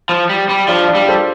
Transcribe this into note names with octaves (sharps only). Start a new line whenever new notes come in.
F3
G3
G3
F3 D4 F4
D4 F4
G3
A4 C5